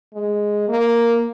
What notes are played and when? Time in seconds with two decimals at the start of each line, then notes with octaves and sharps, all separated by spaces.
0.14 G#3
0.69 A#3